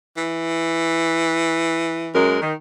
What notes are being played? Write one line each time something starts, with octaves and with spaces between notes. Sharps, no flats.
E3
F#2 G#3 A#4
D#3